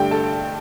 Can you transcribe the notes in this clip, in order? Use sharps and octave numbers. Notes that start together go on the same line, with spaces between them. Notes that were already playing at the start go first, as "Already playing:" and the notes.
Already playing: G2 D3 A3 G4 G5
A4 A5